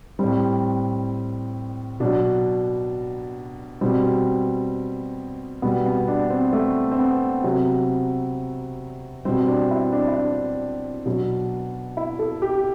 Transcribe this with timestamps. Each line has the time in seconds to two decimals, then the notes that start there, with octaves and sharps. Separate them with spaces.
0.19 A2 G3 C4
2.00 B2 F#3 D4
3.81 B2 G3 C4
5.62 B2 G3 B3
5.86 B3
6.08 D4
6.30 C4
6.53 A3
6.92 C4
6.99 B3
7.44 C3 F#3
9.25 B2 G3 C4
9.48 D4
9.71 E4
9.92 D4
10.08 E4
10.16 D4
11.06 B2 F#3
11.97 E4
12.19 A4
12.42 G4